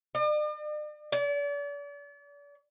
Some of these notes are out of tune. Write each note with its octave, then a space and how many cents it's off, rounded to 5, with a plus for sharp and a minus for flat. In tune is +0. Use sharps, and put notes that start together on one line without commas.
D5 +45
D5 -40